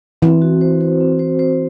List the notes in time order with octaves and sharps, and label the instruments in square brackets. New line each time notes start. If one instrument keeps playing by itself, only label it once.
[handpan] E3 [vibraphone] C4
[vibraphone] F#4
C5
C5
C4
C5
C5